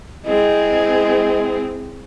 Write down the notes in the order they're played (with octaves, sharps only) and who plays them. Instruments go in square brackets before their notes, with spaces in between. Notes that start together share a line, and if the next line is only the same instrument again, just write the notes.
[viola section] G#3 C4 [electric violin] E4 G#4 [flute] D#5